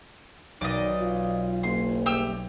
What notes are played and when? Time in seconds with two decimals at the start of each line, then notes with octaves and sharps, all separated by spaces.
0.61 B1 D#3 D5 D#5
1.00 F4
1.63 F#1 C6
2.06 G3 A3 G4 E6